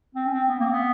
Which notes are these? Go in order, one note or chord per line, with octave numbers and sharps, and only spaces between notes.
C4
C#4
C4
B3
A#3
C4
B3